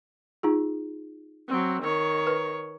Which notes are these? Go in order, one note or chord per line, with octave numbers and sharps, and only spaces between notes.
D#4 F4 G#4
F#3 C4
D#3 C#5
B4